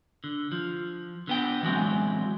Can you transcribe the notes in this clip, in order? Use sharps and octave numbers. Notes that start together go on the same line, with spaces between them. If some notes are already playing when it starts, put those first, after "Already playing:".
D3
F3
D3 B3 G5
E3 F#3 G#3 C4